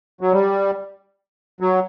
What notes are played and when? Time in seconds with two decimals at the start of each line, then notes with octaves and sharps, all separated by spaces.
0.21 F#3
0.33 G3
1.61 F#3